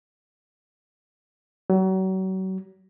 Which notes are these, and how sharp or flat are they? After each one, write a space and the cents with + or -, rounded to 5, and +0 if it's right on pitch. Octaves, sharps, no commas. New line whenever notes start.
F#3 +35